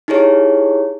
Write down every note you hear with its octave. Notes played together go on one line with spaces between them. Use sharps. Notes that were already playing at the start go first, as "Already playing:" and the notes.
D#4 E4 G4 G#4 C#5